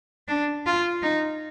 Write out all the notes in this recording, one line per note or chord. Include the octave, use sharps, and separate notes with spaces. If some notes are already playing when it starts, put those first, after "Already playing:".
D4
F4
D#4